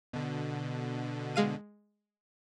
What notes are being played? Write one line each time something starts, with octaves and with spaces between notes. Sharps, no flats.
B2 D3
G#3 F5 D#7